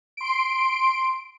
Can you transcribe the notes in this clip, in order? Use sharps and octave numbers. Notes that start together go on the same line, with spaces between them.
C6 D7